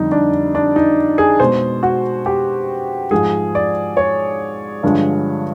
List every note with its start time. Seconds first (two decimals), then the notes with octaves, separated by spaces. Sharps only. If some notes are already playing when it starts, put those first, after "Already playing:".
Already playing: F2 D3 G3 D#4
0.12 D4
0.55 D4
0.76 D#4
1.18 G#4
1.40 B2 G#3 C5
1.83 F#4
2.26 G4
3.11 G#2 F3 G#3 G#4
3.55 D5
3.97 C#5
4.83 G2 D3 F3 G#3